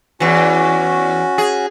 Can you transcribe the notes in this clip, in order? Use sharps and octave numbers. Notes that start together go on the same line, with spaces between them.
E2 E3 C#4 F#4
G#4